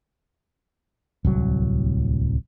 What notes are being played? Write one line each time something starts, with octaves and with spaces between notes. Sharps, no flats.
D1 C2 F#3